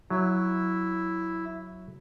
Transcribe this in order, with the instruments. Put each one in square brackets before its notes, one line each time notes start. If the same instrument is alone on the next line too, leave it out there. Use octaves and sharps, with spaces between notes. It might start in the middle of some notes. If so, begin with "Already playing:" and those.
[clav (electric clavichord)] F#3 [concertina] E4